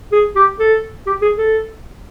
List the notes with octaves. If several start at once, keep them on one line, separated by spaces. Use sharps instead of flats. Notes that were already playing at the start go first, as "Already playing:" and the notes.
G#4
G4
A4
G4
G#4
A4